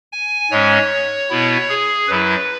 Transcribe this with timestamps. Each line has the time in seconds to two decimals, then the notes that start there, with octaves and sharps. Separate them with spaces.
0.13 G#5
0.51 G#2 G#3 C#4 C#5
1.30 B2 B3 E4
1.69 G#4
2.08 F#2 F#3 E4 B4